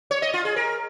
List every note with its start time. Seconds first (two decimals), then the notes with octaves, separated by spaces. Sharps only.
0.11 C#5
0.22 D#5
0.34 F4
0.45 G#4
0.56 A#4